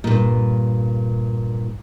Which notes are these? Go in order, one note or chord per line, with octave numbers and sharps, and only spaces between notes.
G2 A#2